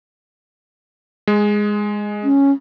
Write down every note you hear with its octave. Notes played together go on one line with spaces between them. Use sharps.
G#3
C#4